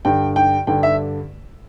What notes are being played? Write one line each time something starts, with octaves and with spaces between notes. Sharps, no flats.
G2 D3 G5
G5
G2 D3 G5
E5